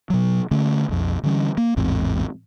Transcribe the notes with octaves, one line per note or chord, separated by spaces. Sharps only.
B2 F#3
D3 A3 C#4
B1 F2
D3 E3 G3 C#4
A#3
A1 E2 G#2 C4